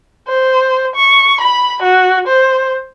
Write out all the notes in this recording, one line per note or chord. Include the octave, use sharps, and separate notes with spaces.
C5
C#6
B5
F#4
C5